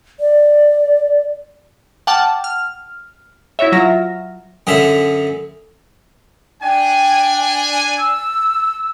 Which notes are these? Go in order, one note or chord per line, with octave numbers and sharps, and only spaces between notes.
D5
F#5 G5 A5 D6 F6
F6
E4 F#4 C#5 E5
F#3 F4 E5 F6 A#6
F#2 D3 G#4 E5
D4 G5 G#5
E6